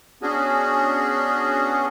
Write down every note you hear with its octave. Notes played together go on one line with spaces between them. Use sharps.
B3 C#4 D4 F#4 G#4